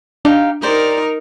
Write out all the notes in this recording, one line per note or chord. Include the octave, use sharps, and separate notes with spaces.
D4 D#4 G4 F5
D#4 G4 A#4 C5 D5